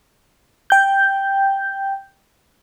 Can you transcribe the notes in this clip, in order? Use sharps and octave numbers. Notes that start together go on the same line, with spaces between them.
G5 G6